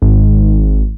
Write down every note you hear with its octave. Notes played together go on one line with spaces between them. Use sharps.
G#1